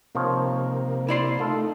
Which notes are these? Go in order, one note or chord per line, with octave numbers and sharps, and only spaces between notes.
C3 D#3 F3 A#3 C#5
E4 D5 C6
A3 D#4 F4 A4